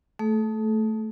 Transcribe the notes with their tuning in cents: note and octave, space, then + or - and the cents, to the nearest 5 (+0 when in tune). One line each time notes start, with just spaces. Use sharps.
A3 +0 A4 -40